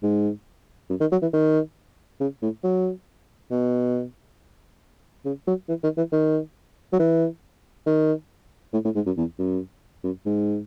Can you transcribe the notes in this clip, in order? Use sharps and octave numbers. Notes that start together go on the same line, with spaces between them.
G#2
F#2
D#3
F#3
E3
D#3
C#3
A2
F#3
B2
C#3
F#3
E3
D#3
E3
D#3
F#3
E3
D#3
A2
A2
G#2
F#2
E2
F#2
F#2
G#2